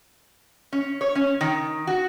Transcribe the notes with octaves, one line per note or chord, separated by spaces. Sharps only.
C#4
C#5
C#4
D#3
F#4